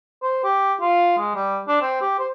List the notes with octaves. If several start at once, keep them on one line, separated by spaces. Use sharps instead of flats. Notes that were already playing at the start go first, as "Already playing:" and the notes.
C5
G4
F4
G#3
G3
D4
C4
G4
C5